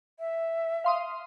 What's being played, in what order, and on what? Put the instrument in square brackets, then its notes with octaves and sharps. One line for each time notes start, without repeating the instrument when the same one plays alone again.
[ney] E5
[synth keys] F5 C6 D#6